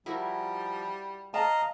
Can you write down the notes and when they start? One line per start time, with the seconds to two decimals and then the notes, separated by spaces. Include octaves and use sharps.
0.06 F3 G3 E4 F#4 A#4
1.34 D#5 F5 A5 A#5